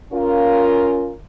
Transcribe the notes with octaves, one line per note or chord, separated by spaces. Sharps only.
C#4 F4 A#4